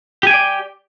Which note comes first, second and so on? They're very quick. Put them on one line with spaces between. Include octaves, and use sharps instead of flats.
G4 G#5 G5 D5